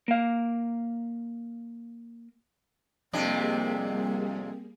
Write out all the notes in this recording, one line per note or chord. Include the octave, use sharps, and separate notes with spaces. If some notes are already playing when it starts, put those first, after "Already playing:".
A#3 F5
F2 C3 G3 A#3 C4 D4 G#4